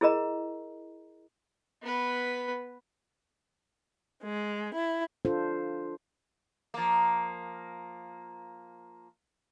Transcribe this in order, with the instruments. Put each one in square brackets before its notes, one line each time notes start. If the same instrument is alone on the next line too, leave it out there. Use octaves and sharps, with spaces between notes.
[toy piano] E4 G#4 A#4 D#5 A#5
[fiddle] B3 B4
[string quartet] G#3
E4
[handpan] D4 F4 A4 C5
[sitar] F3 A#3